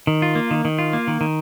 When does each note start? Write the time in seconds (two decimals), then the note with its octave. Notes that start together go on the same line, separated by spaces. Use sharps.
0.07 D#3
0.22 F4
0.35 A#3
0.51 D#3
0.65 D#3
0.79 F4
0.93 A#3
1.08 D#3
1.21 D#3